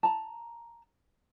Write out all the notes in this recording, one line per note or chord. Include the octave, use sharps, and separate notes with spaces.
A5 A#5